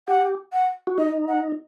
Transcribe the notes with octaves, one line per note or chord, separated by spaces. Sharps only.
G4 F#5
F#5
F#4
D#4 D#5
F#5